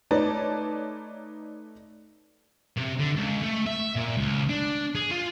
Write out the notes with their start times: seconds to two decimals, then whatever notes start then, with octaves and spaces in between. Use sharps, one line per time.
0.11 A3 D#4 B4 C#5 D5 A5
2.78 C3
3.00 D3
3.17 C#2
3.42 A3
3.66 E5
3.96 A#2
4.17 C#2
4.49 D4
4.95 G#4
5.11 F4